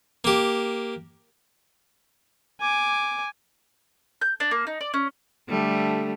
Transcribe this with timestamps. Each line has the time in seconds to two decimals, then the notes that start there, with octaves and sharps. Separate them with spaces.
0.24 A#3 G4
2.60 G#5 D6
4.21 G6
4.40 D4
4.51 A#3
4.67 D#4
4.81 D5
4.94 C#4
5.48 D3 G3 A3